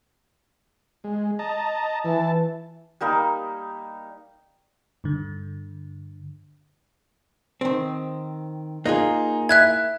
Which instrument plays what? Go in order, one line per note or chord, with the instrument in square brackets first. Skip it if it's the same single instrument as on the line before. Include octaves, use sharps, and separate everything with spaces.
[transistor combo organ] G#3
D#5 A5 A#5
[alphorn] E3 [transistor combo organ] E4 A5
[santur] G3 A#3 D#4 B5
[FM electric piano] G2 D3
[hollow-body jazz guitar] D#3 C4
[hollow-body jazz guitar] A#3 F4 G#4 [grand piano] D#4
[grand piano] E4 [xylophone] E5 F#6 G#6